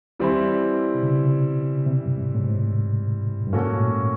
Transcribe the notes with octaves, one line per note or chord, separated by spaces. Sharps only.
E3 G3 C4 E4
C3
C#3
C3
G2
G#2
A2
G#2
G2
G#2 A#3 C#4 F#4 A4
A#2
A2